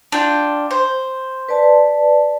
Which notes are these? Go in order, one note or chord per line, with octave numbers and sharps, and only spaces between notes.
D4 F4 G5
C5
B4 D5 A5